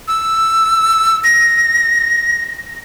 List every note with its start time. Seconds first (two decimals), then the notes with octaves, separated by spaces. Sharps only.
0.08 E6
1.24 A#6